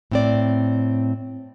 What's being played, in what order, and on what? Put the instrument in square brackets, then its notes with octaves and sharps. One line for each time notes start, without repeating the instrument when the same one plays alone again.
[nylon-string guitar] A2 C4 D5